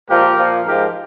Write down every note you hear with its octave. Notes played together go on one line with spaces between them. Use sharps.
A#2 F3 G#3 G4 A#4
A#2 F3 A#3
G#2 F3 G#3 G4 A#4